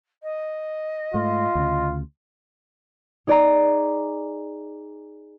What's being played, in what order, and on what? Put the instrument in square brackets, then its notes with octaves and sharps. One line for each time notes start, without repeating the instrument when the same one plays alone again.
[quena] D#5
[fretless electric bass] G#2 A3 [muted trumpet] F4
[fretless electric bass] D2 C#3
[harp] D#4 G#4 D5 G#5 A#5 D6